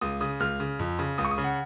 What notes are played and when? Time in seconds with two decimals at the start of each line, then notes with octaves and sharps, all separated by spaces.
0.01 C#2 D#6
0.21 C#3 D#6
0.40 C#2 F6
0.60 C#3
0.79 F2
0.99 C#3
1.18 C#2 D#6
1.25 C#6
1.31 D#6
1.38 C#3
1.44 F#5